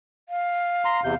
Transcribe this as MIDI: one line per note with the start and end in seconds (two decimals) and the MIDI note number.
0.29 1.17 77
0.85 1.00 82
0.85 1.00 84
1.04 1.15 40
1.04 1.15 48
1.04 1.15 91